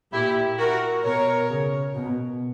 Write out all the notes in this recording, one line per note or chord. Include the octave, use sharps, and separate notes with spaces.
A#2 E4 G4
F#4 A#4
B2 A#4 C#5
C#3
B2